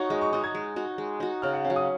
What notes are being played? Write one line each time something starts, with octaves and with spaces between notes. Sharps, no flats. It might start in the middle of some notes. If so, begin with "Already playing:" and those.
Already playing: D#4 F#4 C#5
G#3 D#5
C#6
D#4 F#4 D#6
G#6
G#3
D#4 F#4
G#3
D#4 F#4
C#3 F6
F#5
C#4 F5
F#3
D#6